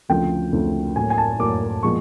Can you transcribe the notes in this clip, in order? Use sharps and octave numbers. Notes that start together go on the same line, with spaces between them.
D2 C#3 F3 A3 C4 G5
D2 C#3 F3 A3 C4
A2 F#3 A#3 G#5
G#5
A5
A2 F#3 A#3 D6
A#2 F3 G#3 B3 C#6